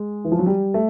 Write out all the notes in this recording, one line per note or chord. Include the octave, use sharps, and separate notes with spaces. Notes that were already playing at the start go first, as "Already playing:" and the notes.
Already playing: G#3
E3
F3
F#3
G3
A3